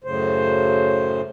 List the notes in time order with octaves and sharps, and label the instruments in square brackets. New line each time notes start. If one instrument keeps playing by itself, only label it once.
[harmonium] F#2 A2 C#3 C5